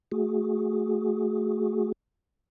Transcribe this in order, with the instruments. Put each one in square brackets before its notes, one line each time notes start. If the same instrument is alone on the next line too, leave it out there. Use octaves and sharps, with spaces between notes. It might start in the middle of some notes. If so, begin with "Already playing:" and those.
[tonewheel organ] A3 F#4 G#4